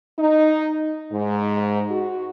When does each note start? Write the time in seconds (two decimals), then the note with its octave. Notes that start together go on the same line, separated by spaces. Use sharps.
0.19 D#4
1.12 G#2
1.91 F#4